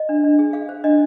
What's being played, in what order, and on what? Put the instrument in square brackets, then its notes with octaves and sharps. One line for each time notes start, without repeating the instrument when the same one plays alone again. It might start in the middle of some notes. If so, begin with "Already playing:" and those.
Already playing: [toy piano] D#5
D4
D4
G#4
G#4 F5
C5
D4 D#5